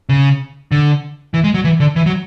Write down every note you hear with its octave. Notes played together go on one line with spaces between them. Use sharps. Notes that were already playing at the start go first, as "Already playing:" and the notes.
C#3
D3
E3
G#3
F#3
E3
D3
E3
F#3